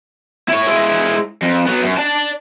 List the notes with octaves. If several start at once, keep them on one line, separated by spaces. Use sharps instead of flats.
E4 C#5
G#3 E4
F2
F#3 B3
F#2
D5 A5